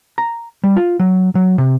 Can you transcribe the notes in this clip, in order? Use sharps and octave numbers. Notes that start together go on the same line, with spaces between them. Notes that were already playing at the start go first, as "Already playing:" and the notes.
A#5
G3
F4
F#3
F#3
C3